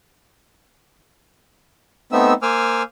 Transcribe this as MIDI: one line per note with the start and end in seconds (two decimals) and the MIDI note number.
2.12 2.34 57
2.12 2.34 59
2.12 2.34 60
2.12 2.34 63
2.12 2.34 76
2.12 2.34 88
2.42 2.83 58
2.42 2.83 72
2.42 2.83 80
2.42 2.83 86
2.42 2.83 88
2.42 2.83 89